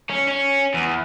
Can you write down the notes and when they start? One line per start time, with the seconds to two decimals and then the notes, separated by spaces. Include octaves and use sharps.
0.10 C#4
0.28 C#4
0.74 E2